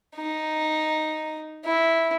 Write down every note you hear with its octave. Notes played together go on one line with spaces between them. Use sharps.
D#4
E4